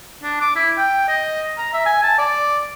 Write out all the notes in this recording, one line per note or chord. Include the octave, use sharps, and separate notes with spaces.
D4
D6
E4
G5
D#5
A#5
E5
G#5
A5
D5